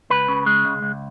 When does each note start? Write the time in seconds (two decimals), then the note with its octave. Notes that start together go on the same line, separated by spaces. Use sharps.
0.10 C#2 B4
0.28 C#3
0.46 G#3
0.65 C#2
0.82 C#2